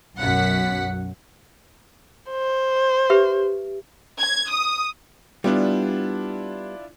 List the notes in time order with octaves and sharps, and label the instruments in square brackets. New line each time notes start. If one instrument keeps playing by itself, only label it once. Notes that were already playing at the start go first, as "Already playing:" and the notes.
[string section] B1 F#2 F#5 B6
[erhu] C5
[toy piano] G4 B4 E5
[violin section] G#6
D#6
[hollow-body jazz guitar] G3 B3 [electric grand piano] D4 E4 F4